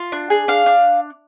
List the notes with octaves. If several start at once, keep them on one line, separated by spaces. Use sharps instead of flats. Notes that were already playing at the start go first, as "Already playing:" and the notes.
Already playing: F4
D4
G#4
D4 F5
D4